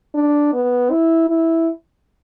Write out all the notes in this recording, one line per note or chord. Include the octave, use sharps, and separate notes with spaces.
D4
B3
E4
E4